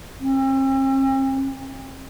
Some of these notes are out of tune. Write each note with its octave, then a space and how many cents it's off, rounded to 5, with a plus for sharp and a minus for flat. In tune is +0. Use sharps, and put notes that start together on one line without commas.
C4 +45